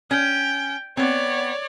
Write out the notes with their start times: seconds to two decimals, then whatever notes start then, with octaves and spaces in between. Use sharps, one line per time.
0.11 C#4 G5
0.97 B3 C4 C#5 D5